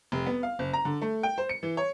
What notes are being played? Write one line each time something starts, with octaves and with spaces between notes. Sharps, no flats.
F1
B3
F5
F#1
A#5
D3
A3
G5
C5
C#7
E3
C#5